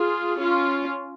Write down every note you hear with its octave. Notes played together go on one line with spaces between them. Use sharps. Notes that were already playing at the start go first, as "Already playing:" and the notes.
Already playing: F4 G#4
C#4 F4